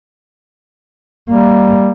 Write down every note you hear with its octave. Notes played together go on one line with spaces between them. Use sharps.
G3 A#3